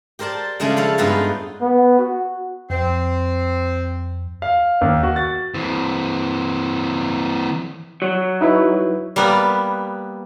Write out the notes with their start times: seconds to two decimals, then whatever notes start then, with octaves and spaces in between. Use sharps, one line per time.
0.19 G4 A#4 C5 D5 A5
0.60 C#3 F3 G#3 A3 D4 G#5
0.77 A4 C#5 F5 B5
0.98 G2 G#3 B3 D#4 F4 B4
1.61 B3
1.98 F#4
2.70 F2 C4
4.42 F5
4.81 D#2
5.03 F#4
5.16 A6
5.54 E3 C4
8.02 F#3
8.41 D#4 E4 B4
9.16 G3 A#3 B3